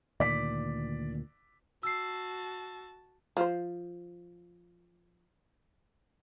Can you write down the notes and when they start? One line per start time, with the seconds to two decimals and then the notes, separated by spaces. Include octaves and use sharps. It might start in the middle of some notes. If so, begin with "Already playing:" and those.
0.20 D2 A#2 D#3 D5 B6
1.83 F#4 A5 E6 C7
3.37 F3 C5